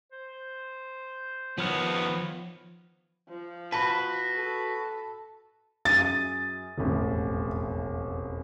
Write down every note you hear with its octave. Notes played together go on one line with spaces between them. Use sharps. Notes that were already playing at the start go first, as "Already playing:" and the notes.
C5
D#3 F3 B3 C#5 F6 F#6
F3
F#4 B4 A5 B5
A4
F#2 G#4 A6 D#7
E1 A1 F2